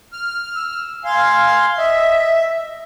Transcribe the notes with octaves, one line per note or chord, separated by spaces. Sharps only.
F6
E6
F5 G#5 C6
D#5 E5